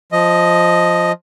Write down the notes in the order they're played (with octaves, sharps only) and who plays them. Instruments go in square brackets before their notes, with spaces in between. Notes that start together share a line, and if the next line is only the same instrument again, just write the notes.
[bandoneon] F3 D#5